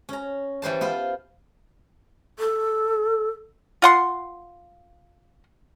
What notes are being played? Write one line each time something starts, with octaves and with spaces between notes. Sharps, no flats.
C#4 A#5
E3 G3 C5 A5
B3 F4 C5
A4
F4 F#5 C6